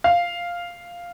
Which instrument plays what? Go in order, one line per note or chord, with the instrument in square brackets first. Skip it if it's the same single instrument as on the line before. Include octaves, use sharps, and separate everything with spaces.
[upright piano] F5